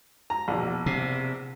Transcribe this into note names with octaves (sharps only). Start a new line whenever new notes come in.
A#5
A#1 E2 B2
C3